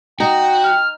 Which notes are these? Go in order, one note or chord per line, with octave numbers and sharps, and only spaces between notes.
D#4 F#4 G5
F6